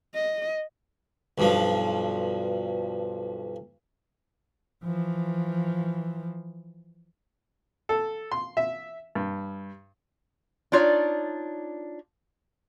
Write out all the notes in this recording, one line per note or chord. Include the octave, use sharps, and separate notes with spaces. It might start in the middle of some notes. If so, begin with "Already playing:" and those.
D#5
B1 G2 F3
E3 F3
A4
C6
E5
G2
D4 D#4 F4 C#5 D5